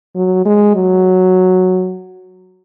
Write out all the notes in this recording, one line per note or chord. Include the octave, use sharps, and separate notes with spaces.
F#3
G#3
F#3